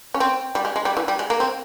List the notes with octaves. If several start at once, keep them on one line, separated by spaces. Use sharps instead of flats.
C#4
C4
G3
G#3
G#3
G3
E3
G3
G#3
A#3
C4